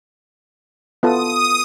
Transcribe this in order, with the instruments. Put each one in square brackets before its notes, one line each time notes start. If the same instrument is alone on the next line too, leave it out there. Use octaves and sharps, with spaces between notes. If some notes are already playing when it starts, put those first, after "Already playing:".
[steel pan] B3 F4 A4 [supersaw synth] D#6